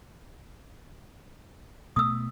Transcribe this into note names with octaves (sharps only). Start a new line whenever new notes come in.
B2 A3 D#6 E6